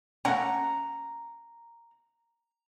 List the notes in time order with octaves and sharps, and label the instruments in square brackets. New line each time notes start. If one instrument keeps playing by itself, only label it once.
[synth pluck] A3 A#3 C#4 [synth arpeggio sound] F#5 [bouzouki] A#5